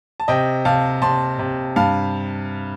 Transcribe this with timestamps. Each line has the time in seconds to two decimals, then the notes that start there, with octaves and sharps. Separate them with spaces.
0.20 A5
0.28 C3 D#5 G5
0.65 C3 F5 A5
1.02 C3 A5 C6
1.39 C3
1.76 G2 F5 A5